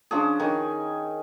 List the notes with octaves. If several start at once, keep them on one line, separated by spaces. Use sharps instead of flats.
F3 C#4 D4 G#4
D#3 C#5 G#5